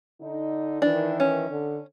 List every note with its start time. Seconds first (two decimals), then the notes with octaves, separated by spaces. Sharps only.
0.21 D3 D#4
0.82 D#3 E3 D4
1.20 C#4
1.50 D3